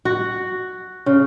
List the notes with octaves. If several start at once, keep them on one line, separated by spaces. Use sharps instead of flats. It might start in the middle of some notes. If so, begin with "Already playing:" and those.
F#4
C#3